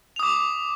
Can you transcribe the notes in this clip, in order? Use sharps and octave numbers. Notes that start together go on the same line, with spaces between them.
D6 D#6 F7